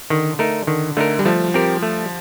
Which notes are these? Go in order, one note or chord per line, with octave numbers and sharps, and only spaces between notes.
D3 D#3
A3 D#4 A#4
D3 D#3
D3 A3 D#4 A#4
G3
F3 A3
C4 G4 A#4
A3